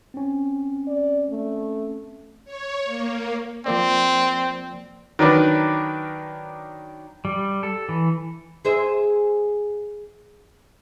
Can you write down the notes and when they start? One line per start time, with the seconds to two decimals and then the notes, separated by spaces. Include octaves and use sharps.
0.14 C4 C#4
0.87 D5
1.29 A3
2.45 C#5
2.85 A#3
3.66 F3 A#3 C4 D5
5.19 D#3 F#3 D4 A#4 B4 D5
7.25 G3
7.63 A4
7.89 E3
8.65 G#4 C5 E5